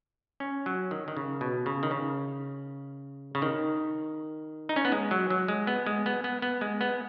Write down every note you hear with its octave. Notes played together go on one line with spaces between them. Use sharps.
C#4
F#3
D#3
D#3
C#3
B2
C#3
D#3
C#3
C#3
D#3
D#4
C#4
B3
G#3
F#3
F#3
G#3
B3
G#3
B3
B3
B3
G#3
B3